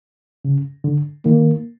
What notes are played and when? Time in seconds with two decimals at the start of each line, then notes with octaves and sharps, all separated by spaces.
0.45 C#3
0.84 D3
1.25 D#3 A#3